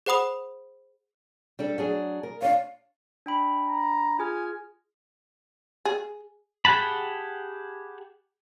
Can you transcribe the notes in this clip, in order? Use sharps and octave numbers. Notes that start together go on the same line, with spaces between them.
G#4 C5 F#5 B5 D#6 F7
G3 D4 A4
F#3 D4 G#4
A#4
D4 C#5 F5
D4 G5 B5
A#5
F4 G#4 G#5 F6
G#4
G4 G#4 F#5 A5 B5